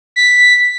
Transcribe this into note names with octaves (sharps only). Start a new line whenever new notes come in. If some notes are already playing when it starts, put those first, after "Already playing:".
B6